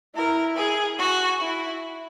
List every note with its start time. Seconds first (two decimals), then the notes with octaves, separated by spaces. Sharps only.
0.15 E4 A#4
0.56 G#4
0.97 F#4
1.38 E4